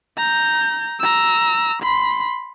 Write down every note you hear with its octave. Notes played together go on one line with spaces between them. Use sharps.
A#5 G6
A#5 E6
B5 C6